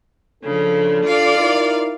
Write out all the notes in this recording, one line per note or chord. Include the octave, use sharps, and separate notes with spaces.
C#3 F3 D4 A4
F4 D5 F5
D#4 E4 A#4